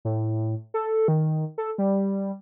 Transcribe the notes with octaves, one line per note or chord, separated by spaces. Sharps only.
A2
A4
D#3
A4
G3